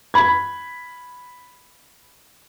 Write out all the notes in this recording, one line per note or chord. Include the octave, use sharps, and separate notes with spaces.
B5 G#6